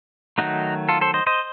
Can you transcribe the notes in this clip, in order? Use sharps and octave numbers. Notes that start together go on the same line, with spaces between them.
D#3 F#3 A3 D#4 F#4
F4 A4
A4 C5
C5 D#5
C5 D#5